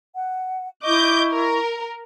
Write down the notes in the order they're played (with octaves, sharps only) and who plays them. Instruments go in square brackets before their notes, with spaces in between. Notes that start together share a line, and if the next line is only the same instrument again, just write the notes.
[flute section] F#5
[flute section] E4 C#6 [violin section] D#5 D6 G6
[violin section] A#4